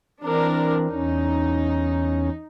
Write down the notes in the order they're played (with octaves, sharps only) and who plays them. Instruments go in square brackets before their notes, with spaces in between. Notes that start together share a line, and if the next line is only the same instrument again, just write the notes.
[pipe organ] E3 C4 [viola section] D4 A#4
[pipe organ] E2 C#4 [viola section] D#4